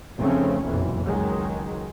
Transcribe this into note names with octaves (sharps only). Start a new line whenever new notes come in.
F1 C#3 F3 A3 C4 C#4
F#1 B1 F2 A#2 E3
C#2 D#3 F#3 G#3